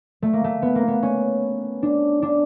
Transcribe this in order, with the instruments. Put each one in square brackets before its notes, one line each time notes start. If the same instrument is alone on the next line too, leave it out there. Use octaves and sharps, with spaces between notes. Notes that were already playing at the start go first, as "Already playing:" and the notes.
[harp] A3
A#3
A3
B3
A#3
B3
C#4
D4
D4